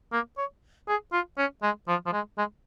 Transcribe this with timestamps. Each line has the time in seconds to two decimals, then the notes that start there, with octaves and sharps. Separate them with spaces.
0.12 A#3
0.37 C#5
0.88 G#4
1.12 F4
1.38 C#4
1.62 G#3
1.88 F3
2.06 F3
2.12 G#3
2.38 G#3